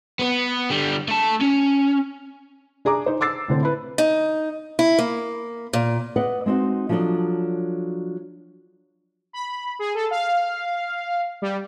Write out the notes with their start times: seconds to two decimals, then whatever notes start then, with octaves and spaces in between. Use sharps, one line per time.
0.19 B3 B4
0.70 D3 G3
1.08 A3 A5
1.41 C#4
2.85 D4 G#4 A#5 D6
3.06 D#4 C5
3.21 D6 E6 A6 C7
3.48 A2 D3 C4
3.63 E4 B4
3.98 D#4
4.79 E4
4.99 A#3
5.73 A#2
6.16 B4 D5 D#5 F#5
6.46 G#3 C4 D#4 F#4
6.89 F3 F#3 D4 A4 D5 D#5
9.33 B5
9.79 G#4
9.95 A4
10.11 F5
11.42 G3